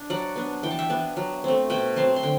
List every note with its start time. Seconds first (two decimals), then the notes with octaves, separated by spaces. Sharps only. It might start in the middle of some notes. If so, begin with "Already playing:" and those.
Already playing: D4
0.10 F#3 D5 F#5
0.36 B3 D4
0.63 E3 G5
0.71 A5
0.79 E5 G5
0.90 B3 D4
1.17 F#3
1.44 A3 C4
1.70 B2 G5 B5
1.96 F#3 C4 A5 C6
2.16 C6
2.23 D3 G5